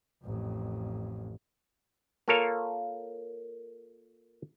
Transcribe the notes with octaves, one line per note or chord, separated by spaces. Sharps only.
A1 F2
A#3 F4 A4 A#4 C#5 F5